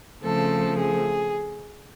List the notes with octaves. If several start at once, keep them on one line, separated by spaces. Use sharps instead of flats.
C#3 F3 A3 C4 A4
G#4